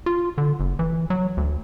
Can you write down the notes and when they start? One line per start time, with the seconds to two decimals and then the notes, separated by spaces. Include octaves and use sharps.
0.06 F4
0.38 D3
0.60 F#1
0.79 E3
1.10 F#3
1.37 D2